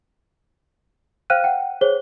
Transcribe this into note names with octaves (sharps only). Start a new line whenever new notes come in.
C5 F5 G5 F6 F#6 D#7
F#5 G5
G#4 C5 C#5 G7